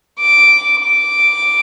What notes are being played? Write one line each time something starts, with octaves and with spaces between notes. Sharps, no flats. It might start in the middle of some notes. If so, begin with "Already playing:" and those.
D6
D6